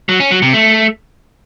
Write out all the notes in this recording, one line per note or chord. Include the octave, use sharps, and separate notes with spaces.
F#3
C#4
F#3
C3
A3